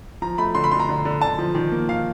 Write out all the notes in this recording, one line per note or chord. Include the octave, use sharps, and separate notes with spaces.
F3 A#5
A3 B5
D3 C6
B5
D3 C6
A#5
D3
D3
D3 A5
F3
D#3
A#3
D#3 F5